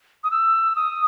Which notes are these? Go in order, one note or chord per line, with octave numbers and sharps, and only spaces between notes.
D#6
E6
D#6